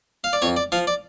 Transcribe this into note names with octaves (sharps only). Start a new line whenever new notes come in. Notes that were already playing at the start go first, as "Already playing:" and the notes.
F5
D5
F2 C#5
D5
F3 F5
D5